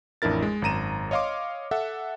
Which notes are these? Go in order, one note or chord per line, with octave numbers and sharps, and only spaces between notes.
A1 F2 D4 E4 A#4 A6
G#3
G#1 F#2 A#5 D#7 E7
C#5 D#5 F5 C6 D6
A4 E5 F#5